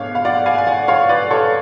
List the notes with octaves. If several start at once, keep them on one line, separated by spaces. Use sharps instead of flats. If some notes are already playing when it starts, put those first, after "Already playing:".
Already playing: G#2 B3 D4 C#5 F5
F5
D5 F#5
F5 G#5
G#5
D5 F#5
C#5 F5
B4 D5
A4 C#5